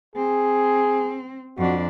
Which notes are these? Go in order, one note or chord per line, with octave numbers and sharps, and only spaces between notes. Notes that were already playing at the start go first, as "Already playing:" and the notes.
C4 G#4
F2 D4 F#4